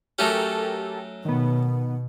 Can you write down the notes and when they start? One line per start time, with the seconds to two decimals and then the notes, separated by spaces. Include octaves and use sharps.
0.19 F#3 A3 C#4 G4 A4 A#4
1.25 B2 D#3 B3